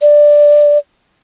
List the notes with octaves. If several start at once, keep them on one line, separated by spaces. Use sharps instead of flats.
D5